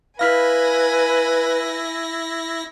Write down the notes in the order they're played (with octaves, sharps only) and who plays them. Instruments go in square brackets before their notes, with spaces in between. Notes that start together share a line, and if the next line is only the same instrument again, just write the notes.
[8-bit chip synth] E4 A#6 [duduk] B4 [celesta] F5 F6 B6 [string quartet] G#5 B5